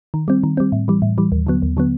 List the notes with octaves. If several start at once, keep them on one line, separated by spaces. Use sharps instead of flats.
D#3
G3 C4
D#3
G3 C4
A2
E3 G3
A2
E3 G3
D#2
D3 F#3 B3
D#2
D3 F#3 B3